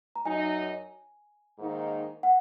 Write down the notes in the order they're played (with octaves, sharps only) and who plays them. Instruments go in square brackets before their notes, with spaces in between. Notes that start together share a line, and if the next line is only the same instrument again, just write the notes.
[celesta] A#5
[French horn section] F#2 F#3 D#4 [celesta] G#5
[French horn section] G#2 D#3 A#3 D#4
[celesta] F#5